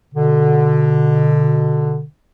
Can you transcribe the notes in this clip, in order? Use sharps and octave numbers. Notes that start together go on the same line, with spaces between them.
B2 D3